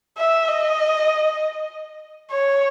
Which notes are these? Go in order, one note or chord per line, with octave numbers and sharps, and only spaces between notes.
E5
D#5
C#5